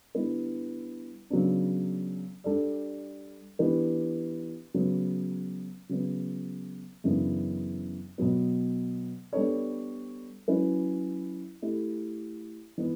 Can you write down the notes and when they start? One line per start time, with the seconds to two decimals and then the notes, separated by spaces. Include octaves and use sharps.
0.15 D3 G3 B3 E4 B4
1.30 C#3 F#3 B3 D4
2.44 G3 D4 A4 D5
3.59 E3 B3 D4 G4 B4
4.74 C#3 F#3 B3
5.89 C#3 F#3 B3
7.04 F#2 C#3 E3 B3 D4
8.18 B2 F#3 B3
9.33 G3 B3 D4 A4 C#5
10.48 F#3 C#4 E4 B4
11.62 A3 E4 G4
12.78 E3 B3